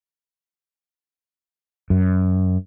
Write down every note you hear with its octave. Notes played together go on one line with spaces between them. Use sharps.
F#2